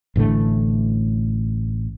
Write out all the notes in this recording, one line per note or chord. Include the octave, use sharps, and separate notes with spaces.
A1 A2 D3 A3